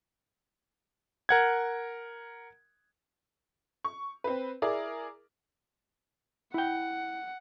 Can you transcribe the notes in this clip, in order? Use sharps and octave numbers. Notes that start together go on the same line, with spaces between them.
A#4 F#5 G#6
C#6
C4 B4
E4 G#4 A#4 D5
E4 F#5 G5